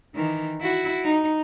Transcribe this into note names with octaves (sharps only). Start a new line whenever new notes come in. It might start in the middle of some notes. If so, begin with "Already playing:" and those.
D#3 E3
E4 F#4
D#4